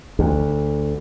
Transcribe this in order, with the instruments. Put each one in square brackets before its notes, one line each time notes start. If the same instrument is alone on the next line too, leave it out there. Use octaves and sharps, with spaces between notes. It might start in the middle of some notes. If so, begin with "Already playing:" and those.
[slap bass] D2